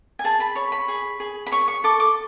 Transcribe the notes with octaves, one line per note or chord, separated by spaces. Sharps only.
G#5
G#4 A5
B5
C#5 B5
B5
G#4
G#4
B5
C#5 C#6
C#6
A4 D6
D6